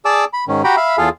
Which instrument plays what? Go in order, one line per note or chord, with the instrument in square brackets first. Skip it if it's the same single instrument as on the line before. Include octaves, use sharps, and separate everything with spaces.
[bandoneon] G#4 D5 A5 D6 E6
B5
G#2 D#3 C#4
F#4 G4 G5 A#5 B5
E5 F5 B5
E2 F4 G#4 A4 F5